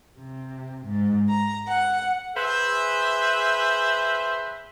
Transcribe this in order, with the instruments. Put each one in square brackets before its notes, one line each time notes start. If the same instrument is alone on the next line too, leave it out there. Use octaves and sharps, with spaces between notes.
[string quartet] C3
G#2
A#5
F#5
[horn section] G#4 B4 C5 E5